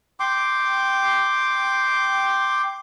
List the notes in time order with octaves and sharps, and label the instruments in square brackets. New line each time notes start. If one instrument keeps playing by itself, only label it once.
[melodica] G5 C6 D6